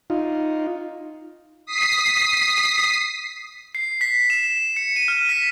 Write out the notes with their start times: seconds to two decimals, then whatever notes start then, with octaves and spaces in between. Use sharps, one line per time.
0.10 D#4 F4
1.66 D#6 B6 C7
3.75 C7
4.01 B6
4.30 E7
4.77 C#7
4.96 D#7
5.08 F6
5.29 B6